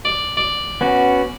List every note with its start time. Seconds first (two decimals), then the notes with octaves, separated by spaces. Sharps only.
0.05 D5
0.37 D5
0.81 B3 C#4 F#4